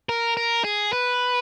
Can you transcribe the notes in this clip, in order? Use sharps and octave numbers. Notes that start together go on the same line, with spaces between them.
A#4
A#4
G#4
B4